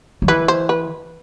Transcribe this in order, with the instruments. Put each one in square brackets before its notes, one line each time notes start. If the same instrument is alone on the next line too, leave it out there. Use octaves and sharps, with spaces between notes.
[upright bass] F#3
[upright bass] E3 [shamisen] B4
[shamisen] C5
B4